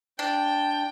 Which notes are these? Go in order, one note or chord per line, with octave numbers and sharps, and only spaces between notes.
D4 G5